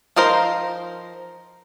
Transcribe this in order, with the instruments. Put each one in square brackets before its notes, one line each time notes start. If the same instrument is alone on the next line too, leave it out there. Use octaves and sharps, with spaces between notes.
[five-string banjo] F3 D#4 A#4 C5